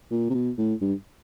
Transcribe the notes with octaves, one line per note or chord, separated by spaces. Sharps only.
A#2
C3
B2
A2
G2